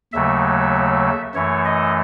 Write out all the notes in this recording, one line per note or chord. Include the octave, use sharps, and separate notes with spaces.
D#2 C#3 F#3 A3 E5
F#2 E3 A3 C#5
D#5